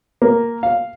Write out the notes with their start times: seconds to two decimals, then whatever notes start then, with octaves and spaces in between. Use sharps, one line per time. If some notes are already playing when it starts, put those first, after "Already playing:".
0.22 A#3
0.63 F5